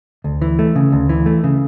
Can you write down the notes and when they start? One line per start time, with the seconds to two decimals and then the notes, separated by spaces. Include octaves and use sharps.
0.24 D2
0.42 E3
0.59 A3
0.76 C#3
0.92 D2
1.09 E3
1.26 A3
1.44 C#3